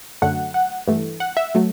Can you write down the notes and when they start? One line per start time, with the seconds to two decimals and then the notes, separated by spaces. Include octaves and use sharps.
0.22 F#2 D3 F#3 A3 F#5
0.54 F#5
0.87 G2 E3 A3
1.20 F#5
1.37 E5
1.55 F#3 A3